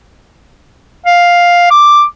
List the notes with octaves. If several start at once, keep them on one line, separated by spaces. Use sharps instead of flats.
F5
D6